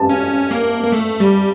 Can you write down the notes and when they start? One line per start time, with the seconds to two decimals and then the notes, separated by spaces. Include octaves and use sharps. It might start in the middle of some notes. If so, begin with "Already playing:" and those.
Already playing: A5
0.09 C#4
0.51 A#3
0.83 A#3
0.92 A3
1.20 G3